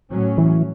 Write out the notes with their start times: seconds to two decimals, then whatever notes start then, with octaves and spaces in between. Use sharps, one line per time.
0.10 A2 F#3 C#4
0.38 E3